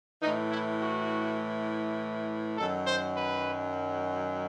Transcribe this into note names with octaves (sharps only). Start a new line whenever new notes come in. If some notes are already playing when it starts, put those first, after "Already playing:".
A2 E3 D#4
E4
F#4
F#2 D#3 F#3 A4
C5
B4